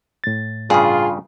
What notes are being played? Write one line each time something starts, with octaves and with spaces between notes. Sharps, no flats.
A2 A6
G2 C#3 F4 G#4